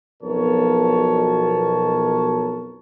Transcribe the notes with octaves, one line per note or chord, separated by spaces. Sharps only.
B1 F2 B2 A#4 C#5 A5